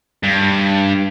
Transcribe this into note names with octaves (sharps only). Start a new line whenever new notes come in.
G2